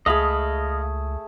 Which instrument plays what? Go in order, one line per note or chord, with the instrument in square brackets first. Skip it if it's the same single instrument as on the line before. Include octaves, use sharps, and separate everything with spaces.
[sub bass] C#2 [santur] A3 G#4 [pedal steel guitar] D#5 F5 B5